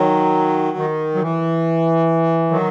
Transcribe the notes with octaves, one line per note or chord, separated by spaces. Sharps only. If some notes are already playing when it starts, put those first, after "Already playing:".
Already playing: D#3 F#3
D#3
F#3
E3
D#3 F#3